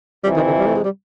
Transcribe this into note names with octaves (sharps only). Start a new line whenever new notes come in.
F2 C3 E3 G3
D#3
D3
G3
A3
G#3
G3